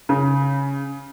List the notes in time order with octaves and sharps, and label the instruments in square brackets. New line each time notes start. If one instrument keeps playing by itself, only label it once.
[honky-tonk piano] C#3